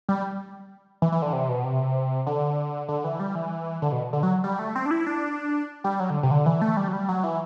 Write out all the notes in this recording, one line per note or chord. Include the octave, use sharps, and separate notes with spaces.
G3
E3
E3
D3
C3
B2
C3
D3
D3
E3
G3
E3
D3
B2
D3
F#3
G3
A3
C4
D4
E4
D4
G3
F#3
D3
C3
D3
E3
A3
G3
F#3
G3
F#3
E3